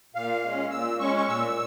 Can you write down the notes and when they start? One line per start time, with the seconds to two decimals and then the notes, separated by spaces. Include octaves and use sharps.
0.15 A#2 F5
0.43 G#3 C#4
0.71 A#2 E6
0.99 G#3 C#4 C#6
1.16 C#6
1.28 A#2 E6